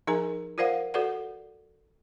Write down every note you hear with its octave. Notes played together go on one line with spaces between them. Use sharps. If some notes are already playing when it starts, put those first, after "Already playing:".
F3 D#4 G#4 A#4 G#5 A#5
F4 A#4 C5 D5 F5 F#5
F#4 A4 B4 D5 F#5